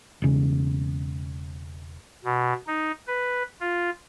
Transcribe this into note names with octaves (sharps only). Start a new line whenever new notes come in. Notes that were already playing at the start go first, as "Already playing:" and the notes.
E1 C#3
B2
D#4
B4
F4